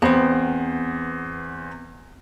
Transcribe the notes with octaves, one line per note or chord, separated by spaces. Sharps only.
E2 B3 C4 C5